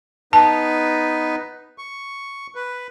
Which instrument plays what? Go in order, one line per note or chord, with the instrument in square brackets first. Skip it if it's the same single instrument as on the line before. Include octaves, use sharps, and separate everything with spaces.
[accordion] B3 D#4 B4 [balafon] A5
[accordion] C#6
B4